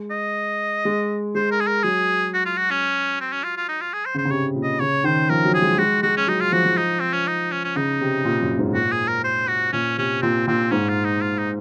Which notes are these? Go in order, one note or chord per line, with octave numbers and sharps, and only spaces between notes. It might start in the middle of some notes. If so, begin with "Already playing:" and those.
Already playing: G#3
D#5
G#3
G#3 C5
A#4
G#4
A#4
F#3 G#4
F#4
F4
F#4
C#4
C4
C#4
F4
F4
D#4
F4
G#4
C5
C#3
C5
C#3
C3 C#5
A#2
D#5
C#3 C#5
D#3 C5
F3 A#4
F#3
G#4
G#3
G#3 F#4
G#3 F#4
C#4
F#3 D#4
F4
F3 F#4
F3
D#4
C4
C#4
D#4
C#4
C#4
C#3 D#4
C3
A#2
F#2
G#2
A#2 F#4
G#4
A#4
C5
F#4
A#2 C#4
C3 C#4
A#2 C4
A#2 C4
G#2 C#4
F4
D#4
F4
D#4